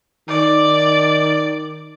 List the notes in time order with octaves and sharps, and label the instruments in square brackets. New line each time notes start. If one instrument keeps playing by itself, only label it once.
[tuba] D#3 [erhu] D5